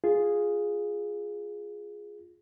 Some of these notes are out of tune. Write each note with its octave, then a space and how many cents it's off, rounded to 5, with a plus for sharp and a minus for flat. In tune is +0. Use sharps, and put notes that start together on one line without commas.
F4 +0 G#4 +0